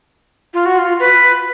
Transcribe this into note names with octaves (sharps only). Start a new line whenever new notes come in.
F4
F#4
F4
B4